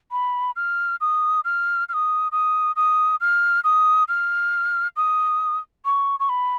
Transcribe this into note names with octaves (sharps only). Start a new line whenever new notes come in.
B5
F6
D#6
F6
F6
D#6
D#6
D#6
F6
D#6
F6
D#6
C#6
C#6
B5